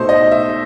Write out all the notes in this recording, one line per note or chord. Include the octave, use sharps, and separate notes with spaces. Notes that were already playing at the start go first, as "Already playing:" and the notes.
Already playing: B2 A3 D#4 C5
D#5
E5